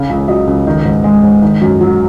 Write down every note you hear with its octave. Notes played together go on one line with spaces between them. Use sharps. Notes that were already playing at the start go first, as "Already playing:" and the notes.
Already playing: C#3 F5
C#2
F#3 D#5
C#2
D#3
G#2
G#3
G#2
D#3
F#2
F#3